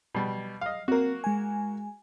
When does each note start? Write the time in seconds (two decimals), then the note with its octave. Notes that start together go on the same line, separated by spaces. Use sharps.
0.15 B2 G3
0.61 D#5 F5
0.88 A#3 C4 F#4 A#4
1.24 G#3 G#5